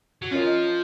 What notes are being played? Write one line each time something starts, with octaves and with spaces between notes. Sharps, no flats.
F#3
F3 C#4 F4 A#4 D#5